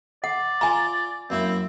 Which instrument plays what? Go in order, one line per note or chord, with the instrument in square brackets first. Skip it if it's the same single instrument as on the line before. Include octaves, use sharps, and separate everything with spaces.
[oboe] D5 [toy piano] F#5
[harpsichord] F4 [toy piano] G#5 A#5
[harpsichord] F#2 A#3 E4 [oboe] C4